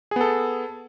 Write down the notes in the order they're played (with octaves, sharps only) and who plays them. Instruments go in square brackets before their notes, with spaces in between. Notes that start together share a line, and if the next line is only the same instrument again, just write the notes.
[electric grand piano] G#4
B3
A4